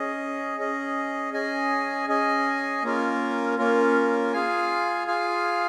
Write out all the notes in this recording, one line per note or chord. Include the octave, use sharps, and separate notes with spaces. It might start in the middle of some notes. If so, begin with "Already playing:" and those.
Already playing: C#4 G#4 D#5
C#4 G#4 D#5
C#4 G#4 D#5 G#5
C#4 G#4 D#5 G#5
A#3 C#4 F4 A#4
A#3 C#4 F4 A#4
F4 G#4 F5 G#5
F4 G#4 F5 G#5